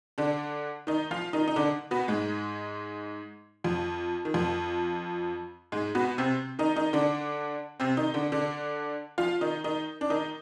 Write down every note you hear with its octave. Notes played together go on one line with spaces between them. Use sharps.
D3 D4
D#3 D#4
F3 F4
D#3 D#4
D#4
D3 D4
B2 B3
G#2 G#3
F2 F3
D#3
F2 F3
G#2 G#3
B2 B3
C3 C4
D#3 D#4
D#3 D#4
D3 D4
C3 C4
D#3 D#4
D3 D4
D3 D4
F3 F4
D#3 D#4
D#3 D#4
D4
D#3 D#4